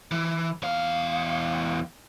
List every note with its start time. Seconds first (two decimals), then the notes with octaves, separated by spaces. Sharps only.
0.11 E3
0.63 E2 F5